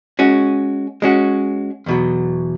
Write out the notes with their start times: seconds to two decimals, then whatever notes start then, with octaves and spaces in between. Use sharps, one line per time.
0.19 G#3 C#4 F#4
1.02 G#3 C#4 F#4
1.86 E2 B2 F#3